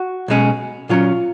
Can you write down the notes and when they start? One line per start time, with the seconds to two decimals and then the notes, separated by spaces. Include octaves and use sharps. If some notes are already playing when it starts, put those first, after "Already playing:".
Already playing: F#4
0.28 B1 B2 G#3 C#4
0.89 A#2 F#3 C#4 F4